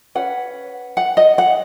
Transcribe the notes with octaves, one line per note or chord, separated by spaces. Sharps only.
C#4 B4 F#5
F#5
D#5
F#5